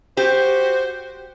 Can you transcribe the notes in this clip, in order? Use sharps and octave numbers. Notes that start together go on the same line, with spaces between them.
F#4 G4 C5